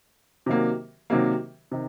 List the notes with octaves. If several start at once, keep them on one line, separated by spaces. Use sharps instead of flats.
C3 D#3 F#3 A#3
C3 D#3 F#3 A#3
C3 D#3